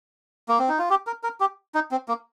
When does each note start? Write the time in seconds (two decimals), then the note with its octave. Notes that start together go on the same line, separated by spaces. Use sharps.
0.49 A#3
0.59 C4
0.69 D#4
0.79 F4
0.90 G4
1.07 A#4
1.23 A#4
1.40 G4
1.75 D#4
1.91 C4
2.08 A#3